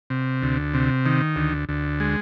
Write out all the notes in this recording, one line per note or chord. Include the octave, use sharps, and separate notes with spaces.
C3
D2
C3
D#3
D2
D2
G#3